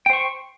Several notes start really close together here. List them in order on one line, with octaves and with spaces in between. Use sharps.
G5 C5 C#6